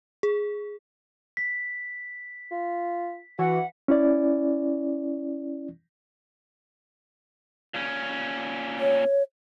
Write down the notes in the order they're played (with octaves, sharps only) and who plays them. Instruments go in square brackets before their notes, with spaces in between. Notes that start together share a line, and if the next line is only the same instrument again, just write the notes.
[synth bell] G#4
[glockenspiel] B6
[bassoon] F4
[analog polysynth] E3 [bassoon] F#4 [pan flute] F#5
[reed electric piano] C#4 E4 D5
[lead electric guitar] A#2 C#4
[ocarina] C#5